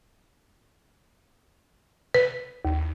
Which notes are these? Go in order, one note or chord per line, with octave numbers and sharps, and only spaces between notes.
B4
D#2